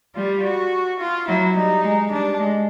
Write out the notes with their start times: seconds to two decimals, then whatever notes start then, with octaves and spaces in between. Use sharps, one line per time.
0.15 G3 F4
0.43 F#4
1.00 F4
1.28 F#3 E4
1.56 G3 D#4
1.83 G#3
2.12 G3 D4
2.40 G#3